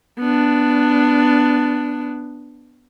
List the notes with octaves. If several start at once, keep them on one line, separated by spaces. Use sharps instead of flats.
B3 D4